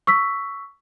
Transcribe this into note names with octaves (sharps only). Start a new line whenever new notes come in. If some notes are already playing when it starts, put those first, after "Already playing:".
C#6 E6 B6